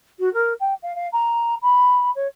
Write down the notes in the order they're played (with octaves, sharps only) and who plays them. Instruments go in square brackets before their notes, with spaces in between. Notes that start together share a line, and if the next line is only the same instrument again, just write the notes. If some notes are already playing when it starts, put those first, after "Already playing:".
[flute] F#4
A#4
G5
F5
F5
A#5
B5
C#5